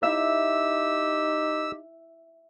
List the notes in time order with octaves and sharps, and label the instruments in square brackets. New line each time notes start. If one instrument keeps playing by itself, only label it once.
[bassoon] D#4 [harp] E4 E5 [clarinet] G4 [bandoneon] E6